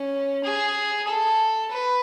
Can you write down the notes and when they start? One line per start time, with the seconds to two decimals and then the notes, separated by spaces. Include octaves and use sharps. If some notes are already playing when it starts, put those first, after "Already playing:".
Already playing: C#4
0.44 G#4
1.07 A4
1.71 B4